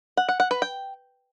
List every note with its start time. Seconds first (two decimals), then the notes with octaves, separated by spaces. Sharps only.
0.17 F#5
0.29 F#5
0.40 F#5
0.51 B4
0.62 G5